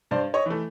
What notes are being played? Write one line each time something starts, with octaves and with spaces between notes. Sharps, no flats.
G2 C5 D5
C#5 D#5
E3 A3